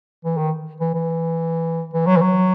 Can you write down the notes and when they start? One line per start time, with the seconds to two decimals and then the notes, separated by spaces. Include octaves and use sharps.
0.25 E3
0.38 D#3
0.80 E3
0.94 E3
1.93 E3
2.07 F#3
2.17 E3
2.21 F#3